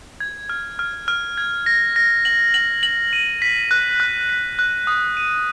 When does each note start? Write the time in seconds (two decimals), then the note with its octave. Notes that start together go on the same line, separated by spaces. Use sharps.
0.20 G#6
0.49 F6
0.79 F6
1.08 F6
1.38 G#6
1.66 A#6
1.96 A#6
2.25 F#7
2.54 F#7
2.83 F#7
3.13 D#7
3.42 B6
3.71 F#6
4.00 F#6
4.29 B6
4.59 F#6
4.87 D#6
5.17 D#7